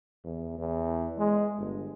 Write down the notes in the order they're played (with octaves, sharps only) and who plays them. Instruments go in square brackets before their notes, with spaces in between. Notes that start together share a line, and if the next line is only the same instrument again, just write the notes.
[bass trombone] E2
E2
G#3
G1